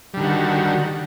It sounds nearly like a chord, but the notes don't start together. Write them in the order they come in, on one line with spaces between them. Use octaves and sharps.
G3 D3 D#3 F#4